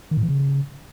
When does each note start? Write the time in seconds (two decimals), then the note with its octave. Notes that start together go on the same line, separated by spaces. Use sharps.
0.11 D#3
0.17 A2
0.23 E3
0.29 C#3